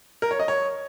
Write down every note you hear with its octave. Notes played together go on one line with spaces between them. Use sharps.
A#4
C#5
D#5
C#5